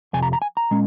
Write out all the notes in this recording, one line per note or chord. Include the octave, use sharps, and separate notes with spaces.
F2 C3 G#5
A#5
A#5
G#5
A#5
A#2 G#3 C#4